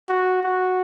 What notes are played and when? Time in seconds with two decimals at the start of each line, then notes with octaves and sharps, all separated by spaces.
0.09 F#4
0.43 F#4